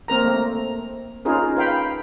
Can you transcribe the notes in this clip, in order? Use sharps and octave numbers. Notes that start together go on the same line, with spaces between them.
A#3 C4 A#4 A#5
A3
C#4 D#4 F4 G#4 A#4
B4 F5 G5 B5